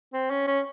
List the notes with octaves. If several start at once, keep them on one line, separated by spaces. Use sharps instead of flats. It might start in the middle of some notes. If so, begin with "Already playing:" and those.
C4
C#4
C#4